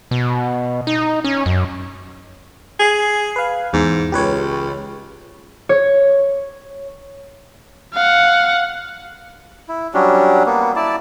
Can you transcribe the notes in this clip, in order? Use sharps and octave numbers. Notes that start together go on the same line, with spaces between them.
B2
D#4
C#4
F#2
G#4
B4 F5
E2 G#2
C#2 G4 B4 C#5
C#5
F5 F#5
E4
F#3 G3 C#4 D4
A#3 B3
E4 D5 A5